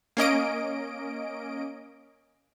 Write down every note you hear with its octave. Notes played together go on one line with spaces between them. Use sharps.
A#3 C#4 D#5 D7